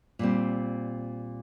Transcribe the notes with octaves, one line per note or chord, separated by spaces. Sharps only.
A#2 G3 C4